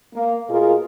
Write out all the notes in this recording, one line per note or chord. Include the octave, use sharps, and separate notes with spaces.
A#3
B2 F4 G#4 A#4